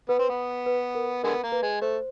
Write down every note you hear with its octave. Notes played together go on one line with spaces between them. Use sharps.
B3 B4
C4
B3
B4
A#4
D3 G#3 B3 A#4
A#3
B4
G#3
A3 C5